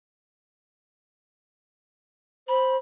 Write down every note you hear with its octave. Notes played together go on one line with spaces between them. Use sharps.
C5 B5